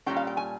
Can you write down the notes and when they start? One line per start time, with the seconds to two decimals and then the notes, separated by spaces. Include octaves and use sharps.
0.06 A#2 G3 C#4 G5
0.17 F5
0.27 G5
0.37 G#5